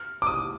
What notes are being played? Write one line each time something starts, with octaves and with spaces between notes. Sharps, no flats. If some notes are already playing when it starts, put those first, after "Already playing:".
Already playing: F6
D6
D#6